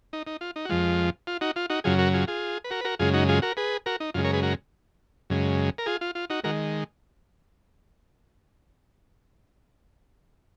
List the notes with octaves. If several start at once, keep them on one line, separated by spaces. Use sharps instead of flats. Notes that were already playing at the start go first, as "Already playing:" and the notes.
D#4
D#4
F4
D#4
F#4
F2 F3 G#3 F4
F4
D#4 F#4
F4
D#4 F#4
F#2 C#3 F#3 F4 G#4
F#4 A#4
F4 G#4
F4 G#4
B4
F#4 A#4
B4
F#4 A#4
F#2 C#3 G#3 F4 G#4
D#4 F#4
F4 G#4
F#4 A#4
G#4 B4
F#4 A#4
D#4
F#2 C#3 G#3 F4
A#4 C#5
G#4 B4
F#4 A#4
F#2 C#3 G#3
A#4
F4 G#4
F4
F4
D#4 F#4
D#3 G#3 F#4 A#4